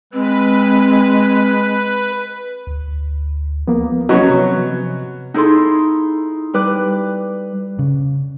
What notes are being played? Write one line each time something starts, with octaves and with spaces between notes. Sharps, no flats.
G#3 C4 B4
D2
F3 A#3 B3
F#3 B3 C#4 D#5
C3
D#4 E4 G#4 A4 C6
G3 B4 D6 F#6
C#3